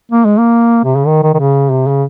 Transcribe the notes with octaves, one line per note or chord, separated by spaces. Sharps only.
A#3
G#3
A#3
C3
C#3
D#3
D#3
D#3
C#3
C3
C#3